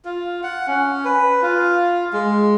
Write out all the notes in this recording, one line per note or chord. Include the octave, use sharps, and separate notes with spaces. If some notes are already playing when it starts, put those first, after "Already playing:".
F4
F#5
C#4
B4
F4
G#3